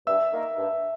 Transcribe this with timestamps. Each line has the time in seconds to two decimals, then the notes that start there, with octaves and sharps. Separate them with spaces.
0.07 G2 E5 E6
0.33 D#3 A#3 D#4 A#4
0.58 G2